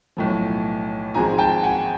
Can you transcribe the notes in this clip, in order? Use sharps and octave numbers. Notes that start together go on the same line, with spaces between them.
B1 A2 F3
G#1 G#2 F3 G#3 C4 G#5 A#5
G5 A5
F#5 G#5